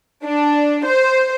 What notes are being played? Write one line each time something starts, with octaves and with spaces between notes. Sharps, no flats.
D4
C5